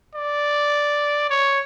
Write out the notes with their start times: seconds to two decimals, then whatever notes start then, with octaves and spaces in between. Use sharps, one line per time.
0.15 D5
1.30 C#5